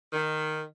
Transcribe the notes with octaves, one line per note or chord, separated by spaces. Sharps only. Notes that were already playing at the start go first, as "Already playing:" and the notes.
D#3